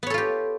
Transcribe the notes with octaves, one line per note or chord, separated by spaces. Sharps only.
B3 F4 G4 A4 C#5